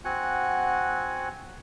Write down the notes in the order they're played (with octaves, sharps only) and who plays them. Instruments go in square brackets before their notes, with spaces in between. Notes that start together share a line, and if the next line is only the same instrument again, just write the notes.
[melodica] C4 F#4 F#5 G#5